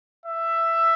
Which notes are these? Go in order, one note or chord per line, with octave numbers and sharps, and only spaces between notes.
E5